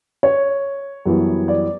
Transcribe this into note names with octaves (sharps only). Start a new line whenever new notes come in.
C#5
F#2 E3 G3 B3
D5